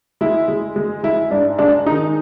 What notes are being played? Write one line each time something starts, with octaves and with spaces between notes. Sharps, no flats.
G#3 E4
G#3
G#3
G#3 E4
G#2 D4
G#3 D4
D#3 D#4